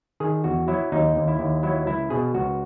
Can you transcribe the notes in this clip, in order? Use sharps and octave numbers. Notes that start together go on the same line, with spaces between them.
D#3 G#4
E2 F#4
F#3 E4
D#2 D#4
D#2
E4
D#2
F#3 E4
C#2 E4
B2 G#4
C#2 F#4